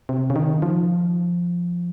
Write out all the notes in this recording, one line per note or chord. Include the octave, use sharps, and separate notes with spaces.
C3
C#3
D#3
F3